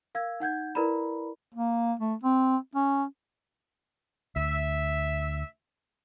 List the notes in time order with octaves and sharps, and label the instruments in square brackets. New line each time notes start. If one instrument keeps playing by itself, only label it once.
[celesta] A#4 F5 E6 G#6
D#4 F#5 G6 G#6
E4 A#4 B4 D5 A#5 B5
[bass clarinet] A#3
A3
C4
C#4
[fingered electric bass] D2 [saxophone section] E5